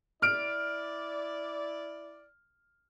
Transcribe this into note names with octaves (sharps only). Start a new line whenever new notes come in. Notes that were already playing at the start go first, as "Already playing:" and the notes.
E4 D5 F6 D7